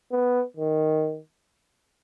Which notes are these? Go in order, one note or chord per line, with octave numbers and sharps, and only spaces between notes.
B3
D#3